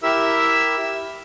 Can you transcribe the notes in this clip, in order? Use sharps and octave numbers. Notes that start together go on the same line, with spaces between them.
E4 G4 A#4 E5 E6